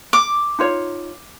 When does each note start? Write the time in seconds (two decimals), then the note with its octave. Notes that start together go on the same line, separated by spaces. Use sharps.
0.13 D6
0.59 D#4 F4 C#5